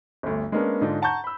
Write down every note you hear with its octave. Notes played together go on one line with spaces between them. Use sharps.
G1 D2
G#3 A#3 B3 C#4 D4 A#4
G#2 D3 D4 D#4 F4
F#5 A5 A#5 C#6 G6
B5 E6